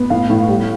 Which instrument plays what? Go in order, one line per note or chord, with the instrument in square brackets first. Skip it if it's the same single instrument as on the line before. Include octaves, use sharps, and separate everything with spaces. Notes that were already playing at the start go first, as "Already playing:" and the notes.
Already playing: [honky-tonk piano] B3
A2 F5
A2
G3